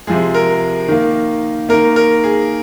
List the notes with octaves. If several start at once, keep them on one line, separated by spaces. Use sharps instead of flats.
C3 F3 G#3 G#4
A#4
D#3 A#3
D#3 A#3 A#4
A#4
G#4